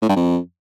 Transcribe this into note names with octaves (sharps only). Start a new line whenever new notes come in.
A2
G2
F2